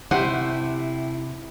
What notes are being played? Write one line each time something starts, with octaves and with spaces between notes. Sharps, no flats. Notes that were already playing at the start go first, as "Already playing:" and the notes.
C3 A3 E4 G4 C5 F#5